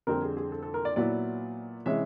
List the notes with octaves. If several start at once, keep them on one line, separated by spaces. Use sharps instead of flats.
F2 D3 G3 C4 A#4
G#4
G#4
A4
A4
A#4
D5
A#2 F#3 B3 E4 D5
C3 E3 G#3 C#4 E5